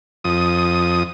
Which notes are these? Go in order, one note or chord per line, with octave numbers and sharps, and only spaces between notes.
F2 D#6